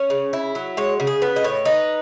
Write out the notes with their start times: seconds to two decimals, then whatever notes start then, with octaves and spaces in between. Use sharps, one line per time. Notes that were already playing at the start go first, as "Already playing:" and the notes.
Already playing: C#4 C#5
0.10 C#3
0.33 E4
0.55 F#3
0.77 G#3 C#5
1.00 C#3
1.07 G#4
1.22 B3 B4
1.36 D#5
1.44 A2 C#5
1.65 D#4 B4